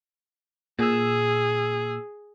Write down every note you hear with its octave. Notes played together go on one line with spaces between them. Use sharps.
A#2 G#4 E6